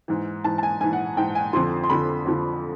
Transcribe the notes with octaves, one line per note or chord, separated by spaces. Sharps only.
G#2 E3
G#2 E3 A5
A5
G#5
G#2 E3 G#5
F#5
G#2 E3 G5
G#5
F2 D3 F3 C6
C6
F2 D3 F3 B5
F2 D3 F3